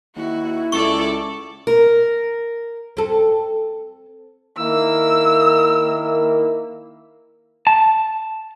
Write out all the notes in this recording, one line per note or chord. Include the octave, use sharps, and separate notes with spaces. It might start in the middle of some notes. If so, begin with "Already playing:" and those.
D#2 E4 F#4
C#2 A4 D5 C#6
A#4
C4 A4
D#3 A#3 E4 E6
A5